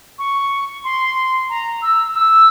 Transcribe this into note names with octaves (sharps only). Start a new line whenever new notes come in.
C#6
C6
A#5
E6
E6